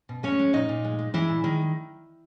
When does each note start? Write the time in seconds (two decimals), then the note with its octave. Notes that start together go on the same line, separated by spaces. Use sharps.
0.09 B2
0.23 G#3 C#4 C#5
0.39 G#3
0.53 A#2 D#4 D#5
0.69 A#2
0.84 G#3
0.99 G#3
1.14 E3 G#3 E4
1.29 A#2
1.44 D#3 G#3